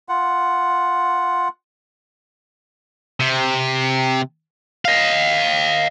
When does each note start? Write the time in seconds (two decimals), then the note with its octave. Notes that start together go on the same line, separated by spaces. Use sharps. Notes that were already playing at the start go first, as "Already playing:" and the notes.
0.09 F4 F#5
3.20 C3
4.85 D#5 F5